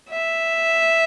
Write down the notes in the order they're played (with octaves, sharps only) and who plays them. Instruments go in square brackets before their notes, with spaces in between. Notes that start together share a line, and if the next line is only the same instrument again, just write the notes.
[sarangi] E5